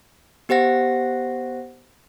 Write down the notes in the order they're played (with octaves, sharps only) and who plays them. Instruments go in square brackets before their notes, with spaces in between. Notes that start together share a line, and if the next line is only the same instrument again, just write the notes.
[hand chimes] B3 G4 C5 F#5 A#6